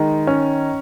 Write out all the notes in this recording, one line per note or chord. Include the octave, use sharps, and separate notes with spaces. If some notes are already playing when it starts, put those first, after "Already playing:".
Already playing: D#3 G#3
C#4